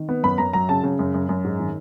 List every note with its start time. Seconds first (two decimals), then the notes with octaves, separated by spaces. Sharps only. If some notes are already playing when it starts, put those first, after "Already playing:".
Already playing: D#3
0.09 B3
0.23 F#2 B5
0.38 F#2 A#5
0.53 F#3 A#5
0.69 C#3 A5
0.84 C#3
0.99 F#2
1.14 F#2
1.29 F#2
1.44 G#2
1.59 D#3